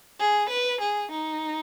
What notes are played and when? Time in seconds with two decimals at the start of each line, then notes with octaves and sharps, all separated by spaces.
0.20 G#4
0.50 B4
0.81 G#4
1.11 D#4